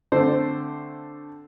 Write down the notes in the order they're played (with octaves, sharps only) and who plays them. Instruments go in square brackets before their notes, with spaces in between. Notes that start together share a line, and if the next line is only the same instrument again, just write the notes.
[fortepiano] D3 A3 C4 A4 C5